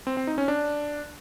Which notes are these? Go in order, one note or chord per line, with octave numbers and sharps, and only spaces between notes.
C4
C4
D#4
C#4
D4